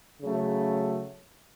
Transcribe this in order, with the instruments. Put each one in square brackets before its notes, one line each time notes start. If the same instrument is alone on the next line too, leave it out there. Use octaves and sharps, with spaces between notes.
[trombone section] C#3 F#3 A3